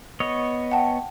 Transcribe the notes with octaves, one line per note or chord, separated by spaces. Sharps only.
B3 C#5 D#5
F#5 G5 A5